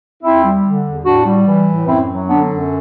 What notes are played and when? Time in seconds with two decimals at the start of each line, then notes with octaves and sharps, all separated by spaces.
0.23 E2 C4 E4
0.45 G3
0.65 D3
0.85 E2
1.05 A2 D4 F#4
1.26 G3
1.46 E3
1.67 A2
1.87 F#2 C4 E4
2.08 F#3
2.28 D3 B3 D4
2.48 F#2